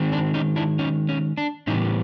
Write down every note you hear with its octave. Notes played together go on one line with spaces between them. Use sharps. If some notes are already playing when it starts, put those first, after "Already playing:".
Already playing: D#3 G#3 C4
D4
C#4 D#4
D4 E4
C#4 D#4
C#4
D4
A2 E3 G3 B3 C#4 D#4